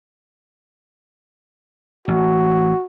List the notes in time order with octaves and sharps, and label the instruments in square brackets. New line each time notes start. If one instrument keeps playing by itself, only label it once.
[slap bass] A1 [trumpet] F#4